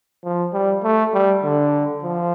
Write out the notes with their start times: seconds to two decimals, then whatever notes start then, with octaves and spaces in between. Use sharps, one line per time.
0.24 F3
0.53 G3
0.83 A3
1.14 G3
1.43 D3
2.03 F3